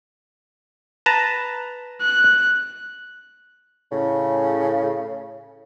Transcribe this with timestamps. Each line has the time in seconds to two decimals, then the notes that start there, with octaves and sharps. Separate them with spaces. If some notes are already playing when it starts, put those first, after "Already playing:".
1.06 B4 A5 A#5
2.02 F#6
3.91 A2 C#3